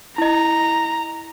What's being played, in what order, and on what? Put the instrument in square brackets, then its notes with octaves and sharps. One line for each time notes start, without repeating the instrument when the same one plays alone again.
[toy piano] E4 D#5 [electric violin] A#5